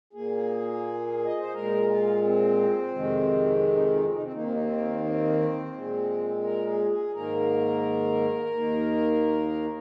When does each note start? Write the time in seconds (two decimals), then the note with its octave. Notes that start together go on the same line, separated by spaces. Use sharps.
0.13 A#2 A#3 G#4
1.25 D#5
1.39 C5
1.53 A#2 G#3 A#4
1.88 F4
2.23 C4
2.94 F2 C3 D#3 G#3
3.63 C4
3.74 D#4
3.83 C4
3.93 D#4
4.03 C4
4.12 D#4
4.23 C4
4.33 D#2 D#3 A#3 D#4
4.42 C4
4.52 D#4
4.62 C4
5.04 C4
5.73 A#2 G#3
6.44 A#4
6.67 G#4
6.91 G#4
7.13 G#2 D#3 A#3 A#4
8.54 D#2 D#3 A#3